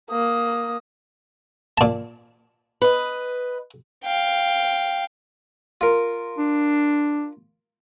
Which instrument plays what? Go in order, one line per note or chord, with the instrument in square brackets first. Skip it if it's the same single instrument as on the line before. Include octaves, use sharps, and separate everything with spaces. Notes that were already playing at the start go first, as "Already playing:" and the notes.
[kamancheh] A#3 D#6
[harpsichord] A#2 A5
[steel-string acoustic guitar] B4 D#5
[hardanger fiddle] F5 G5
[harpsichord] F4 A#4
[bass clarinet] D4